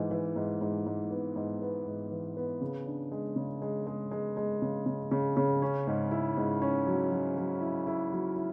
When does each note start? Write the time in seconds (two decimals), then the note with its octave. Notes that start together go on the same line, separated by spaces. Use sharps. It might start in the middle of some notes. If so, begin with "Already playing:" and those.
Already playing: G#2 E3
0.11 E3
0.36 G#2
0.61 G#2
0.86 G#2
1.11 B3
1.36 G#2
1.62 B3
1.86 G#2
2.11 E3
2.37 B3
2.62 C#3
2.87 D4
3.11 G#3
3.36 C#3
3.62 G#3
3.87 G#3
4.11 G#3
4.37 G#3
4.62 C#3
4.86 C#3
5.11 C#3
5.37 C#3
5.62 C#4
5.87 G#2
6.11 E4
6.37 G#2
6.62 C#4
6.87 F#3
7.11 F#3
7.37 F#3
7.61 E4
7.87 E4
8.12 F#3
8.36 E4